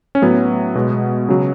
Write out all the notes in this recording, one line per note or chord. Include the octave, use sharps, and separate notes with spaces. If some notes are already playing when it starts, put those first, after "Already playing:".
C#4
A2 F#3 B3
B2 G#3
C#3 F#3